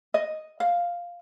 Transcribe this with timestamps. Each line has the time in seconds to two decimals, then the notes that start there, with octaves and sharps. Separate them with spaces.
0.14 D#5
0.60 F5